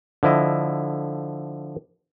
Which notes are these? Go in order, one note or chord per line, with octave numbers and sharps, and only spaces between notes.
D3 F3 E4 D#5